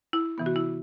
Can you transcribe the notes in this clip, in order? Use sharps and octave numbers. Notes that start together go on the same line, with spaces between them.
E4
C3 E3 B3
F#4
E4